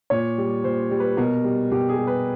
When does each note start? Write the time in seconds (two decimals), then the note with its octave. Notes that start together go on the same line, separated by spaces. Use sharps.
0.10 A#2 C#5
0.38 G3
0.64 A#2 C5
0.91 G3
1.00 B4
1.17 B2 A#4
1.44 G3
1.71 B2 G4
1.89 G#4
1.97 G3
2.07 B4